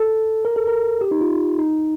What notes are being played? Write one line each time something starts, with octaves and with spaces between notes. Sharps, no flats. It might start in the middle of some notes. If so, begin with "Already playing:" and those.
Already playing: A4
A#4
A4
A#4
G4
D#4
F4
D#4